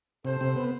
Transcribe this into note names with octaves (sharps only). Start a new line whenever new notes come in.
C3 A4 C5
C3
B3